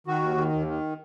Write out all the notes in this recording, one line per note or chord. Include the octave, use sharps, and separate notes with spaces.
D#3 F#4
D#2
D#3
D#2
D#3